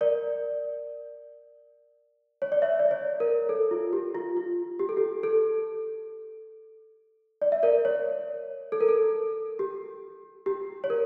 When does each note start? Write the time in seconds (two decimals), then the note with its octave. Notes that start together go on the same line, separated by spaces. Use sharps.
0.01 A#4 D5
2.42 C#5
2.52 D5
2.62 C#5 E5
2.79 D5
2.91 C#5
3.20 A#4
3.49 A4
3.71 F4
3.93 G4
4.15 F4
4.37 F4
4.79 G4
4.89 A4
4.97 G4
5.23 A4
7.42 D5
7.52 E5
7.63 A#4 D5
7.85 C#5
8.72 A4
8.81 A#4
8.88 A4
9.59 G4
10.46 G4
10.84 C#5
10.90 A#4